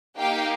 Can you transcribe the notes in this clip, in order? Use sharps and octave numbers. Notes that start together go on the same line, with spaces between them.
A#3 D#4 G4 F5 G5